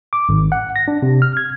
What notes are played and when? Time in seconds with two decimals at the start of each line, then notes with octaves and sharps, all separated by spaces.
0.13 D6
0.29 G#1
0.52 F#5
0.76 A#6
0.88 D4
1.02 C3
1.22 F6
1.37 G#6